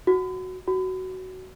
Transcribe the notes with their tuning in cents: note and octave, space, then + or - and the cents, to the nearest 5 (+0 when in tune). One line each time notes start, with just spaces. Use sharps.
F#4 +0
F#4 +15